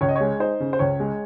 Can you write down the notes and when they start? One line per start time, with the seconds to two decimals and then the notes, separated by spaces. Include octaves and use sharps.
0.01 C#2 C#5
0.09 D#5
0.16 G#3 C#5
0.40 D#4 C5
0.60 C#3
0.73 C5
0.79 C#2 C#5
1.00 G#3